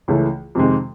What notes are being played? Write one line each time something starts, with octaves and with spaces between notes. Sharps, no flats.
C#2 C#3 E3 A3
F2 C3 D#3 G#3 C4